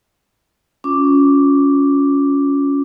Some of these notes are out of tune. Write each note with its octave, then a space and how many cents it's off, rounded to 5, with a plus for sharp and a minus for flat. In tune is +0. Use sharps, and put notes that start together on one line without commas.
C#4 +15 F4 +25 D6 +0